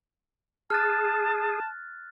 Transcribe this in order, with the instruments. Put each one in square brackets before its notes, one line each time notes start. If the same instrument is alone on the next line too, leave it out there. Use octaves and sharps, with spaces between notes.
[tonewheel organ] G#4 [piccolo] A5 [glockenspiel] F6 F#6 A6